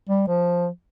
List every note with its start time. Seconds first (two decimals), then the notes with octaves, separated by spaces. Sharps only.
0.09 G3
0.28 F3